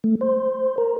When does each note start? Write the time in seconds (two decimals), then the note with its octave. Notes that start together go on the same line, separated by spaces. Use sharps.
0.04 A3
0.21 C5
0.78 A#4